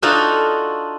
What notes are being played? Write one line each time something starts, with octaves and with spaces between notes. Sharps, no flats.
D4 D#4 F4 F#4 A4